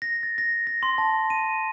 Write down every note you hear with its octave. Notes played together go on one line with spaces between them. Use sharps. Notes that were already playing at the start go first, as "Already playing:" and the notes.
A#6
A6
A#6
A#6
C6
A5
D#7